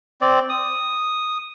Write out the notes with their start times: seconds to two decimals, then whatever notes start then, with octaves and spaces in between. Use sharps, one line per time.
0.21 C4 D5
0.49 D#6